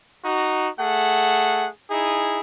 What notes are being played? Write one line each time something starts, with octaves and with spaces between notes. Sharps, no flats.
D#4 F#4
A3 G#4 F#5
D#4 E4 G#4